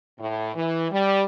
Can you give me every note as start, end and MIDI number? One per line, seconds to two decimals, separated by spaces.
0.20 0.52 45
0.55 0.87 52
0.91 1.23 55